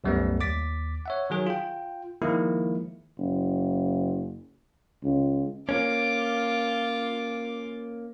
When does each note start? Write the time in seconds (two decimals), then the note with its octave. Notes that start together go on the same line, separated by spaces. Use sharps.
0.04 C2 F#2 G3 A3 B3
0.40 D#2 D6 A6 B6
1.06 C#5 E5 F#5
1.30 D#3 F#3 G#4
1.46 F4 G5
2.22 D#3 F3 G#3 A#3 E4
3.19 F#1
5.04 C#2
5.69 A#3 C#4 F4 D6